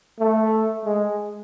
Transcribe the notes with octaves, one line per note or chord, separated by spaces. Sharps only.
A3
G#3